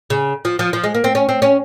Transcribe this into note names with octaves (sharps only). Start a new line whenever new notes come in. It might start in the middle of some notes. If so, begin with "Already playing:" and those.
C#3
F3
F3
F3
G#3
A#3
C4
C#4
C4
C#4